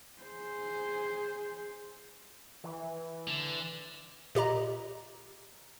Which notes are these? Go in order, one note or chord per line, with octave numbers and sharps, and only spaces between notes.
G#4 C5
E3
D3
A#2 G4 D#5 A#5